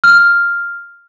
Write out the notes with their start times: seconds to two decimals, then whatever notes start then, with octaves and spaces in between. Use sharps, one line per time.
0.04 F6